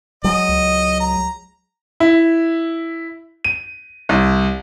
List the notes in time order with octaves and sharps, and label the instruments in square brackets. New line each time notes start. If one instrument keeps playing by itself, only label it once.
[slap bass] F#3 G#3 [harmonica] D#5
[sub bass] C#2
[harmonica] A#5
[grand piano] E4
D#7
C2